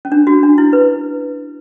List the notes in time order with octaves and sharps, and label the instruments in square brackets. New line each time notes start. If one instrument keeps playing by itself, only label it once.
[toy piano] C#4
D4
F#4
D4
E4
B4